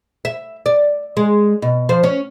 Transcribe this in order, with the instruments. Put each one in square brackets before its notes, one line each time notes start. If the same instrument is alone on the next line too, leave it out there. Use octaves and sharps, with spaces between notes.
[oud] E5
D5
G#3
B2
F3 C5
C#4